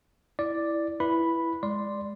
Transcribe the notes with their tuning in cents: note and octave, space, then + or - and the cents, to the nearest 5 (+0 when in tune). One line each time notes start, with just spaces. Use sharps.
E4 +0 D5 +0
E4 +10 B4 -10 B5 +0
G#3 +0 D5 +0 C6 -5